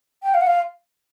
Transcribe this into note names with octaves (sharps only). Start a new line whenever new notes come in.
G5
F5
F#5
F5